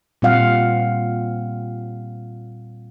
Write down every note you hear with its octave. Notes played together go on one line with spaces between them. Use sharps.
A#2 G3 C4 F4 F5 F#5